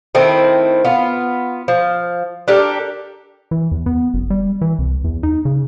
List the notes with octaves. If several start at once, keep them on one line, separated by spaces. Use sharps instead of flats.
D#3 A3 C4 E4
B3 F4
F3
D4 G4 A4 A#4
E3
E2
B3
F#1
G3
E3
C2
E2
D#4
C#3